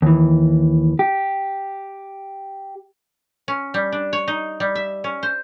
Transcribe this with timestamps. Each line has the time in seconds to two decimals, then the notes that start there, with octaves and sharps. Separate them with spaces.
0.02 D#2 E3
0.99 G4
3.48 C#4
3.74 G3
3.92 D4
4.13 C#5
4.28 D#4
4.60 G3
4.75 E5
5.04 C#4
5.23 C5